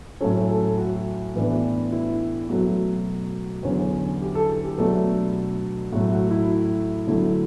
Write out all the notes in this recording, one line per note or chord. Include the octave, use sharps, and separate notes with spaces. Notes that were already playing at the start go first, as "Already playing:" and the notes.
A2 F#3 C#4 A4
A4
F#4
A2 E3 B3 D4
E4
B2 F#3 A3 F#4
E2 D3 F#3 C#4
G4
A4
G4
B2 F#3 A3 D4 A4
A2 F#3 A3 F#4
F#4
E4
D3 F#3 A3 E4